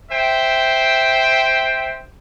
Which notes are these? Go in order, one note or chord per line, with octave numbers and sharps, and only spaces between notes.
C5 E5 G5